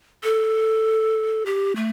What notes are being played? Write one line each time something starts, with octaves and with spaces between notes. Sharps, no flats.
A4
G4
A3